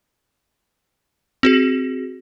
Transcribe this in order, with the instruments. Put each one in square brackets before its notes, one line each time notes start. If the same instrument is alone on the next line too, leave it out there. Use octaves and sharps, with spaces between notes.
[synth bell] C4 F#4 G#4